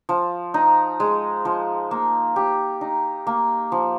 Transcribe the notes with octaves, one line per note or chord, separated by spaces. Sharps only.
F3
D#4
G#3
F3
A#3
G4
D#4
A#3
F3